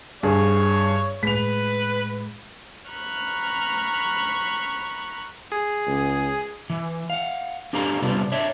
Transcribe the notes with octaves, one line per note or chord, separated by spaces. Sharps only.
G2 G#4 C#5
A2 G#3 B4 B6 F7
A#5 B5 C#6 F6 F#6
G#4
C#2
E3
F5 F#5
D4 G4 A4 A#4 F5 A#5
C3 G3 B3 D4 F4
D4 C#5 E5